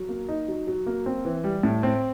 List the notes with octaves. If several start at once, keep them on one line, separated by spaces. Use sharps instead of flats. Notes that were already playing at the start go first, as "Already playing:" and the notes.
Already playing: F#3
A#3
D#4
F#3
F#3
A#3
C4
E3
G3
A2
C4